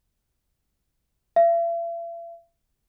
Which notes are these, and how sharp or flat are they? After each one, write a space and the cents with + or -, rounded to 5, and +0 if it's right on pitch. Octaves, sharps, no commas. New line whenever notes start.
E5 +45